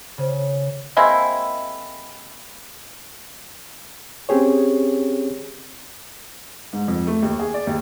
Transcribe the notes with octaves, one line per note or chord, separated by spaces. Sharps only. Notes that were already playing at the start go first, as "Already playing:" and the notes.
C#3
G#3 A#3 C4 E4
C4 C#4 G4 G#4 C#5
G#2
F2
A3
D#2
G#4
D5
D#2